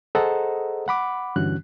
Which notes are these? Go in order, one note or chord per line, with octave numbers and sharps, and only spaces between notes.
G#4 A4 C5 D#5 F#5 A#5
F#5 B5 D6
G2 D3 E3 C#4 F#4 F#6